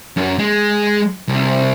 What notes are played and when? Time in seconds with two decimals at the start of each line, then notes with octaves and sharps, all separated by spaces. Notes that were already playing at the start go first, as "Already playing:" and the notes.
0.17 F#2
0.39 G#3
1.28 C2